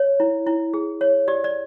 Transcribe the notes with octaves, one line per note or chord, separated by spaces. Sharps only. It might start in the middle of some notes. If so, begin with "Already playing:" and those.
Already playing: C#5
E4
E4
G#4
C#5
G4 D5
D5